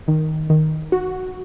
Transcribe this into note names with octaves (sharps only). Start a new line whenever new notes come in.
D#3
D#3
F#4